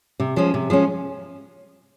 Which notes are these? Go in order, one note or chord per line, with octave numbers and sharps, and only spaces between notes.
C3
F3 G#3 C#4
C3
F3 G#3 C#4